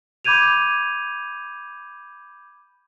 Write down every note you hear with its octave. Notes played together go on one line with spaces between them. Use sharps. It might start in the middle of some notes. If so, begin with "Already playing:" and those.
B5 D6 G6 G#6 D#7 F7